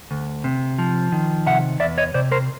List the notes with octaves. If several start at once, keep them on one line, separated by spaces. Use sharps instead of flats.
D2
C3
F3
D#3
C3 E5 F#5
E2 D5 E5
C#5 D#5
C3 C5 D5
A#4 C5